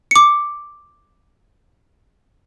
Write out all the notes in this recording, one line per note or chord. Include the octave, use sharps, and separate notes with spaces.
D6 C#7